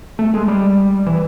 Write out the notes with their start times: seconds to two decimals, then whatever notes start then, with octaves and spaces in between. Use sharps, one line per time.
0.19 A3
0.34 G#3
0.48 G3
1.07 E3